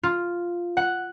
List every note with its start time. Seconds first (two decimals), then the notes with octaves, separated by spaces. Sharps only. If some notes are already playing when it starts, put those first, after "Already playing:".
0.03 F4
0.77 F#5